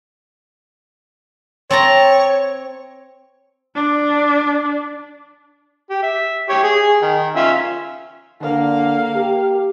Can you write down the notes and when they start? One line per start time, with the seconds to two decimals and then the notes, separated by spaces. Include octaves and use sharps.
1.71 C4 C#5 A5 A#5
3.75 D4
5.90 G4
6.03 E5
6.49 G4 C#5 C#6
6.64 G#4 G#5
7.02 D#3
7.36 C#4 F4 E5
8.41 D3 A#3 F5
9.15 G4